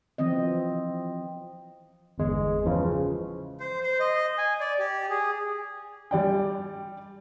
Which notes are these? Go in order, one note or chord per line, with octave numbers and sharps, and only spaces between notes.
E3 F3 C4 D#5
G1 E2 G#3
C#3 E3 F3
C5
C5
D#5
G#5
D5
G4
G#4
G3 D5 G5